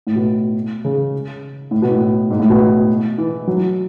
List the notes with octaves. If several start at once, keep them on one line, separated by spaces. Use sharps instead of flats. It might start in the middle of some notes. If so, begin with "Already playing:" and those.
A2
B2
C#3
A2
B2
A2
G#2
A2
B2
E3
F#3